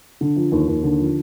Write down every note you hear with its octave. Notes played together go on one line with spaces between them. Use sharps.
D3
F3
D#2
D#2
D3
F3